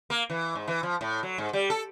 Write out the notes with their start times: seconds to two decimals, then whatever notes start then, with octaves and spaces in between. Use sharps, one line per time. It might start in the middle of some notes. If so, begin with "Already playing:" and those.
0.10 A#3
0.30 E3
0.55 G#2
0.68 E3
0.83 F3
1.01 A2
1.23 F#3
1.38 G#2
1.53 G3
1.70 A4